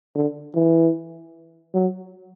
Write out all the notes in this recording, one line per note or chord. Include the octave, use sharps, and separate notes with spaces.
D3
E3
F#3